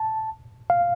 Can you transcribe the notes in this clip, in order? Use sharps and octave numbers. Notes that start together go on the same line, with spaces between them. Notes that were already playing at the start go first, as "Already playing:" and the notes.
Already playing: A5
F5